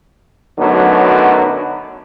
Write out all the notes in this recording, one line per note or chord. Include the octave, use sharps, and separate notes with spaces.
F#2 D3 F#3 A3 B3 D#4